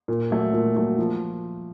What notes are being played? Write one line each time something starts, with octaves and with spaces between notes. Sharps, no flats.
A#2
F#3 A3
A#2
F#3 A3
F3